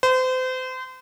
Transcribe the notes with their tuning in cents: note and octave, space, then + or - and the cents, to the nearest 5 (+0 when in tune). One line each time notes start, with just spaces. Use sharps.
C5 -35